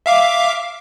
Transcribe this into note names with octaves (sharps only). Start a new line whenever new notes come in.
E5 F5 D6